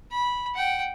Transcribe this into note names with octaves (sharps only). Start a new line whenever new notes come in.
B5
F#5 G5